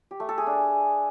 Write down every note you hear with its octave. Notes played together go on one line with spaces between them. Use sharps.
G4
A3
A4
G#4
D4